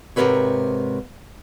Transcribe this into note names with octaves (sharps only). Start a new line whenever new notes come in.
G#2 C3 B3 A#4 B4 C#5